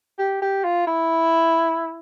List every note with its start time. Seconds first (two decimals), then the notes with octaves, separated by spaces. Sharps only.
0.19 G4
0.42 G4
0.64 F4
0.87 E4